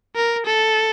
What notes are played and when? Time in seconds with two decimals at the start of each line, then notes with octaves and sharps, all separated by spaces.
0.15 A#4
0.46 A4